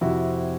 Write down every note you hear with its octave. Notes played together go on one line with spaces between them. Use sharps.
F2 C3 F3 E4 F#4